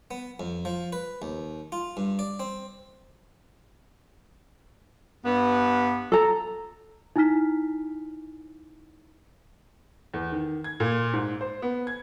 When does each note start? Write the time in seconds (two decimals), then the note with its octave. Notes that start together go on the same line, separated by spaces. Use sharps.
0.11 B3
0.40 F2
0.65 F3
0.93 B4
1.22 D#2
1.72 F4
1.97 G2
2.19 D5
2.40 C4
5.25 G2 B3
6.12 A4 A#5
7.16 D#4 E4 G#5 F6 B6
10.14 E2
10.32 D#3
10.64 G#6
10.80 A#2
11.13 G#2
11.41 C5
11.62 B3
11.87 G#6